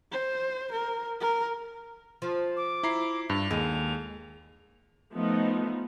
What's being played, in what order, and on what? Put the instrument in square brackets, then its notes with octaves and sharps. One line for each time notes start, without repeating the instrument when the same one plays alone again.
[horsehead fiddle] C5
A#4
A#4
[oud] F3
[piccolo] D6
[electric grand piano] E4 A#5 C7
[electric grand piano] G2 [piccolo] F7
[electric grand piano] D#2 [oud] G#3
[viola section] F3 A3 B3 D#4